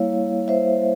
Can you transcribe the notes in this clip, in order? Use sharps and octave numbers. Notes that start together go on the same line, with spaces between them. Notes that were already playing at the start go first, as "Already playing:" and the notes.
Already playing: G3 A#3 E4 C#5 F5
C5 E5